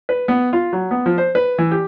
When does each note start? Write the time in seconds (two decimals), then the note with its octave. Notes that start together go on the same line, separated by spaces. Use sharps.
0.09 B4
0.28 B3
0.53 F4
0.73 F#3
0.91 B3
1.06 F3
1.18 C5
1.35 B4
1.58 E3
1.71 G4